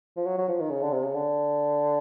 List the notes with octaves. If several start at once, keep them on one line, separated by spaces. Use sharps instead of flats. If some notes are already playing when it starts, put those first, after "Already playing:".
F3
F#3
F#3
F3
D#3
C#3
D3
C3
C#3
D3